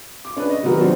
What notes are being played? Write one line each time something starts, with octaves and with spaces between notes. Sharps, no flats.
D6
C#4 D4 G#4 B4
D#5
C3 D#3 F#3 B3 A#4 B4
F#2 A#2 F3 C4 D4